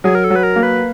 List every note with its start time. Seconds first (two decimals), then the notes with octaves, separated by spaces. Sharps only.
0.04 F#3 G#4
0.15 A#4
0.24 A4
0.30 F#3
0.36 B4
0.43 A#4
0.56 A#3
0.63 B4